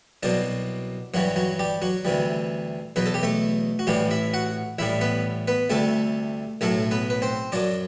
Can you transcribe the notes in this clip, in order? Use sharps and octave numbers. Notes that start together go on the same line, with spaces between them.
C2 B2 F#3 D4 D5
G2 E3 F#3 G3 F#4
F#3 F#4
G3 G4
F#3 F#4
D2 C3 E3 G3
E2 B2 F#3 B4
A4
G4
A3 A4
F#4
A1 A2 E3 G3 G4
E4 E5
F#4 F#5
A1 A2 G3 E4 E5
B3 B4
B3 B4
D2 C3 G3 A3 A4
B1 A2 F#3 A3 A4
B3 B4
B4
C4 C5
F#2 F#3 D4 D5